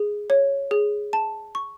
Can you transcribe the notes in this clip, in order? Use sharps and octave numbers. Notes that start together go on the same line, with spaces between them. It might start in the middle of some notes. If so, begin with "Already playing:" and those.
Already playing: G#4
C#5
G#4
A5
C#6